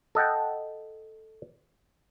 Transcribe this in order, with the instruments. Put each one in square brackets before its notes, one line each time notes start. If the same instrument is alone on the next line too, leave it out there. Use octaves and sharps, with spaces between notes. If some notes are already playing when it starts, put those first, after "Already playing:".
[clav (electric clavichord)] A4 D#5 F#5 G5